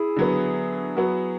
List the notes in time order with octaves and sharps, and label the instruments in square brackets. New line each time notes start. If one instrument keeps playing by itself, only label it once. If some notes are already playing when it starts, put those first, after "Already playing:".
Already playing: [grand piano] E4 G#4
[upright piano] D3 F#3 B3
F#3 B3 F#4